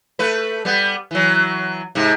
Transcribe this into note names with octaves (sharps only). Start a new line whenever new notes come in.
A3 B4
G3 B3
E3 F#3
G#2 C3